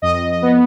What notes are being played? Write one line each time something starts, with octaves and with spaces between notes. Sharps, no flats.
F2 D#5
B3